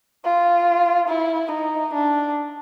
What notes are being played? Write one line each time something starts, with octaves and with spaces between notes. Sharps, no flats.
F4
E4
D#4
D4